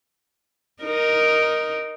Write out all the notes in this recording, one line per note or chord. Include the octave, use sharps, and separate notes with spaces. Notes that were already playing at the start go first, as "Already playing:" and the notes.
D#4 A#4